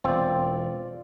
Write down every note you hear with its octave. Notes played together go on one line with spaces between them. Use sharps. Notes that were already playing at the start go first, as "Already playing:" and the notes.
E1 C4 F4 D5